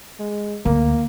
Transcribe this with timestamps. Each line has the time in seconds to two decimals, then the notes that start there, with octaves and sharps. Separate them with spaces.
0.19 G#3
0.65 D2 A#3